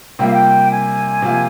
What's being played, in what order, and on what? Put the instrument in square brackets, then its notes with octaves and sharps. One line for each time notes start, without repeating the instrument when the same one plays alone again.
[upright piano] C3 G3 A#3 F4 [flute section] G5
[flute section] F5
G5
G#5
[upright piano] C3 F3 A#3 F4